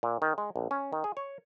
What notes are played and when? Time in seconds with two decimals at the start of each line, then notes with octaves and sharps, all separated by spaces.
0.03 A#2
0.22 D#3
0.38 G#3
0.56 A#1
0.71 C#4
0.93 D#3
1.04 G#4
1.17 C#5